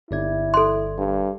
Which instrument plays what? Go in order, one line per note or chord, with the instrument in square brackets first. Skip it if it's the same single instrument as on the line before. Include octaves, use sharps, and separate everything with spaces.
[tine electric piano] G1 D5 G#6 [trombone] E4
[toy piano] A4 C6
[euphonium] G2